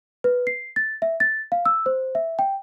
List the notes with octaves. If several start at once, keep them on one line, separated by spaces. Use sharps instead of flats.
B4
C7
A6
E5
A6
F5
E6
C5
E5
G5